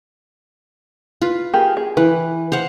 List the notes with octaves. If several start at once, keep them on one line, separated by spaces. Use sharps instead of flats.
F4 B4
A#3 G4 G#4
G#4
E3 B4
C5 F5 F#5